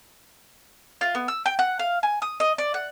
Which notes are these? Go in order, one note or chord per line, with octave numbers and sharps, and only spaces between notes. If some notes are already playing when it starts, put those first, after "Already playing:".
F4
B3
E6
G5
F#5
F5
G#5
D#6
D#5
D5
F#5